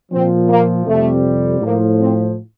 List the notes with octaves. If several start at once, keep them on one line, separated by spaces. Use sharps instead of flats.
A#2 F3 C4
A#3
F2 C3 G3 A3
A2 F3 A#3
C4